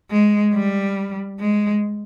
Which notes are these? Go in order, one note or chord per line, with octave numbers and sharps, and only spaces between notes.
G#3
G3
G#3